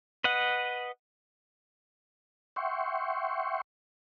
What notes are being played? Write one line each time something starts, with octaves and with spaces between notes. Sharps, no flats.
B4 D#5 F#5
E5 F#5 G5 C6 C#6